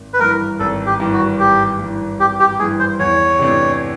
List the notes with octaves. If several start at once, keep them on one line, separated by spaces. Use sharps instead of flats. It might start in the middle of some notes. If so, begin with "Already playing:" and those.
Already playing: G#1
B4
G2 E3 A#4
G#1 A4
G4
G2 E3
F#4
G#1 G4
G2 E3
G#1 G4
G4
G2 E3 G#4
C5
E2 C#5
C3 E3 A3 D4